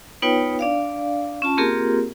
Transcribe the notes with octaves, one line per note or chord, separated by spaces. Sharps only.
B3 D#4 F4 B4 C#5 G5
D4 D5 F5
C#4 F4 A5
A#3 C4 F4 G4 G#4 A#4